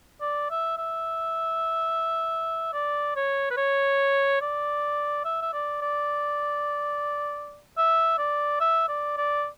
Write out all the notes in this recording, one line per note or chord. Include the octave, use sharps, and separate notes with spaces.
D5
E5
E5
D5
C#5
B4
C#5
D5
E5
E5
D5
D5
E5
D5
E5
D5
D5